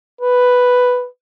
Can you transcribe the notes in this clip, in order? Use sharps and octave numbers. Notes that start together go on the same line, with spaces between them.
B4